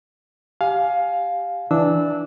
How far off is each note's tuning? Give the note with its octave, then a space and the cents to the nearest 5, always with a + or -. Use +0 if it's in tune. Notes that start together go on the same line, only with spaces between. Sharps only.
G4 +0 F5 +10 G#5 +25
E3 +0 D4 +0 E6 -20